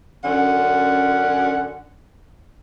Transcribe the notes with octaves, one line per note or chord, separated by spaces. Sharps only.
F#2 D3 C#4 F#5